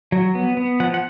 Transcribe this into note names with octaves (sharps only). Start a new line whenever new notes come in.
F#3
B3
B3
F3 F#5
F#5